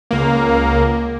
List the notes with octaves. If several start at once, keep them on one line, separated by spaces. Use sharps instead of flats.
C#2 A#3